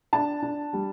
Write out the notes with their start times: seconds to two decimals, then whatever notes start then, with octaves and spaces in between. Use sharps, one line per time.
0.13 D4 A5
0.43 D4
0.73 G3